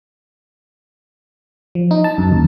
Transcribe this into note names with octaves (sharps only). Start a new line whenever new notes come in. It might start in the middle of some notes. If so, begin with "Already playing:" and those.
F3
D#4
A5
F#2
D#2